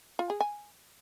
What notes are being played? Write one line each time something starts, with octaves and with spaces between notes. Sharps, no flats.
F4
G#4
G#5